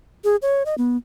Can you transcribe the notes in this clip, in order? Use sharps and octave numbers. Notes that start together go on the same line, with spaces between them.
G#4
C#5
D#5
B3